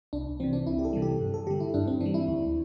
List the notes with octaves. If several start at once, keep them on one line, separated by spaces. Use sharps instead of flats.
C2 D4
C3 E3 C4
D4
C2 E4
G4
A4
C3 E3 G3
G4
G2
A4
D3 G3 G4
E4
G2 D4
C4
E3 D4
G3
E4
D2